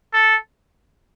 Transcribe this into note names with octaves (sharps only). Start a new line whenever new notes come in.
A4